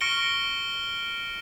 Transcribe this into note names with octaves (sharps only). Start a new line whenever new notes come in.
C#6 F6 A#6 C#7 D7 G7